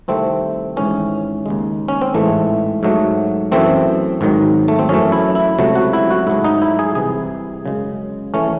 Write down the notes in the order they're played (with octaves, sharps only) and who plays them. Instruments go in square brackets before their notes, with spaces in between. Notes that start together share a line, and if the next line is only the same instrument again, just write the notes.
[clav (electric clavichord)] C2 C3 D#3 A3 C4
G#1 G#2 E3 C#4
D#2 C#3 G#3
C#4
C4
A1 G#2 E3 G#3 A3
G#2 F#3 A3
F#2 E3 A3 C4
G#1 G#2 D#3 F#3
A3
C4
F#2 E3 A3 C#4
E4
E4
C#2 C3 F#3 A3
F#4
E4
F#4
G#2 F#3 A3 E4
D#4
E4
G#4
C2 C3 E3 G#4
F#2 C#3 G#3
E3 A3 C#4